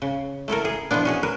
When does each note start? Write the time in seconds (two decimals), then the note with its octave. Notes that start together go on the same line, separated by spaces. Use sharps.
0.02 C#3
0.48 A3 E4 A4 A#4
0.65 G#4
0.91 B2 E3 F3 B3 D4
1.05 C#4 F#4 G#4
1.23 A#4 B4